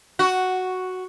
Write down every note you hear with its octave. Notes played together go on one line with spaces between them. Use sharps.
F#4